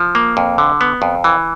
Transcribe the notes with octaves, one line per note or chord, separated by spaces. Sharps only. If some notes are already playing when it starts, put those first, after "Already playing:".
Already playing: F3
A#3
F2
D3
B3
F2
E3